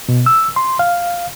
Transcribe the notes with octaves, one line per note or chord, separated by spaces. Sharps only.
B2
E6
C6
F5